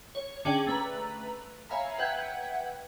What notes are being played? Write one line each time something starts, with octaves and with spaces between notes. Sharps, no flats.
C#5
D3 C#4 G#4 D5 G5 F#7
A3 B4 A#5
C#5 E5 F5 G#5 A#5 B5
B4 E5 F#5 G5 G6 G#6